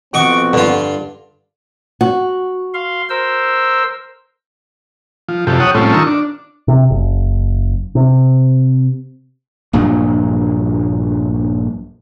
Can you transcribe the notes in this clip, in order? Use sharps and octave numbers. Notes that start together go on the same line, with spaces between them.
F2 B3 C4 F#4 D#5 C#6 D6
G2 D3 F4
F#4
F5 C6
A#4 C5 E6
F3
F#2 C3 F3 G4 A4
G4 C#5 F#5 D#6
A2 F3 G3 C4 C#4 A4
D#3 F4 A#4 C#6 E6
D4
C3
F#1
C3
A#1 G2 A#2 F#3